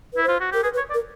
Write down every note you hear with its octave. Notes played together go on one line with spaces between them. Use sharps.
E4 B4
C5
F4
F#4
G4 A#4
G#4 B4
B4
C#5
D5
A#4